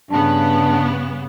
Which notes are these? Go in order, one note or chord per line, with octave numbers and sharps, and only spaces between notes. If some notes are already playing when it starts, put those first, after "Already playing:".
G2 C#3 B3 D4